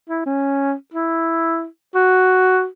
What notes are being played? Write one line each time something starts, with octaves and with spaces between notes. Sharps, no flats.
E4
C#4
E4
F#4